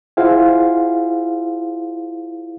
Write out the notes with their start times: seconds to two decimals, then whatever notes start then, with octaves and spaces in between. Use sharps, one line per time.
0.17 E4 F4 G#4 C5 F5 F#5